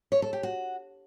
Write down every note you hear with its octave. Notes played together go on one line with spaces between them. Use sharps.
C#5
A4
G4
F#4